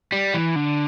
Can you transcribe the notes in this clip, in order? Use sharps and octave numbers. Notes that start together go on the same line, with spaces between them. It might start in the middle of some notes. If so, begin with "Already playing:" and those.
G3
E3
D3